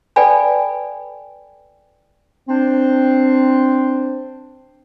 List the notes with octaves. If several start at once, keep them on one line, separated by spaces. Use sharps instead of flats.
A4 B4 D5 G5 G#5 B5
C4 D4 C5